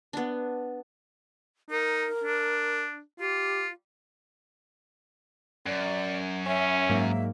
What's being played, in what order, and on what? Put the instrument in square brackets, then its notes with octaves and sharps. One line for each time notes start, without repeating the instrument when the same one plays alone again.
[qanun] B3 D4
[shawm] D#4 [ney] A#4
[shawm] D4
[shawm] F4 [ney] G4
[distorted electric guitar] F#2 [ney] D5
[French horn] C#4 [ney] E5
[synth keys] G#2 F#3 A#3